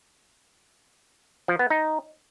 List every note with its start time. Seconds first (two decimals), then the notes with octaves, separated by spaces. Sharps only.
1.48 F3
1.59 B3
1.70 D#4